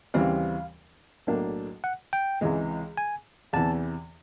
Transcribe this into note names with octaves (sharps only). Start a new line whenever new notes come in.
D#2 C#3 E3 G3 C4 F5
B1 A2 F#3 A#3 D4
F#5
G5
C#2 C3 E3 G#3
G#5
E2 C3 E3 A5